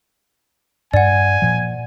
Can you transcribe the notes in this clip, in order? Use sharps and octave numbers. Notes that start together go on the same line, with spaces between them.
G2 D5 F#5 G#5
A#2 F3